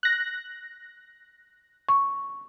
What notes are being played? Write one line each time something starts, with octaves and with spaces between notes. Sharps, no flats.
F#6 A#6
C#6